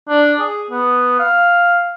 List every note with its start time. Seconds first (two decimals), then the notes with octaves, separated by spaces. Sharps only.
0.09 D4
0.40 G#4
0.71 B3
1.19 F5